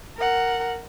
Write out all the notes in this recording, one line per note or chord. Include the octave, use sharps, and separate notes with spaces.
A#4 F#5